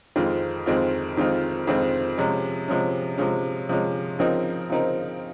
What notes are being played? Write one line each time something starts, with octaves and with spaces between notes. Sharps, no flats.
F2 D#3 G#3 C4 F4
F2 D#3 G#3 C4 F4
F2 D#3 G#3 C4 F4
F2 D#3 G#3 C4 F4
C3 F3 G#3 C#4
C3 F3 G#3 C#4
C3 F3 G#3 C#4
C3 F3 G#3 C#4
C#3 F3 C4 D#4 A#4
C#3 F3 C4 D#4 A#4